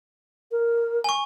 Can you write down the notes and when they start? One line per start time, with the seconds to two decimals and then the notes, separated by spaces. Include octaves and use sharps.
0.51 A#4
1.04 G#5 C#6